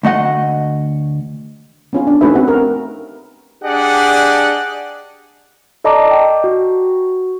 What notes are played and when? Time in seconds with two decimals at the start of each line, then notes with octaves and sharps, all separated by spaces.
0.03 D2 A3 D#5 F#5
1.93 B3 C#4 F4
2.07 D4
2.21 A3 C#4 D#4 F#4 B4 E5
2.35 C4 F#4 G4 F#5
2.48 A#4
3.63 D4 G4 G#4 D5 D#5 F#5
5.84 A4 D5 D#5 A5 A#5 D6
6.11 G5
6.44 F#4